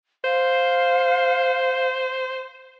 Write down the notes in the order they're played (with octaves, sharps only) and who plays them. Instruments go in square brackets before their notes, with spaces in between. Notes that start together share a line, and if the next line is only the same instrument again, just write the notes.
[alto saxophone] C5 [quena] F5